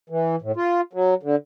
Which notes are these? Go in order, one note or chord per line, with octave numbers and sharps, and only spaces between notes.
E3
A2
F4
F#3
D3